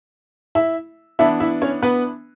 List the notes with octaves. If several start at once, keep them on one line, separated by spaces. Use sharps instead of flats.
E4 E5
E3 B3 D4 E4 E5
E4 E5
C#4 C#5
B3 B4